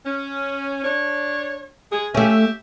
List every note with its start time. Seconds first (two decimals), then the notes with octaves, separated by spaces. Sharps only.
0.05 C#4
0.84 D4 C#5
1.92 G#3 G#4
2.15 A3 C#4 G4 E5